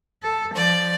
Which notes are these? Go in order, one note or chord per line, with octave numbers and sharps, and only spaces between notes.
A4
F3 D5